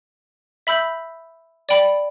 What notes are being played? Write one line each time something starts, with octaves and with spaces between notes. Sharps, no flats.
E5 B5 E6 G6
D5 G5 B5